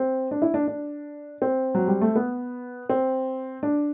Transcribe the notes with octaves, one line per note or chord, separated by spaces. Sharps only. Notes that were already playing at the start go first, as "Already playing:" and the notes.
Already playing: C4
D4
E4
D4
D4
C4
F#3
G3
A3
B3
C4
D4